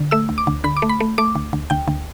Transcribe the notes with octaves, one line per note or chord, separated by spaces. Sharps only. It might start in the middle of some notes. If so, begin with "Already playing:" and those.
Already playing: D3
A3 E6
D2
D6
D2
D3 B5
D6
A3
B5
A3
A3 D6
D2
D2
D2 G5
D2